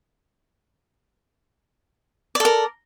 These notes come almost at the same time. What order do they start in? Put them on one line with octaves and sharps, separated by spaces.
D5 A4 A#4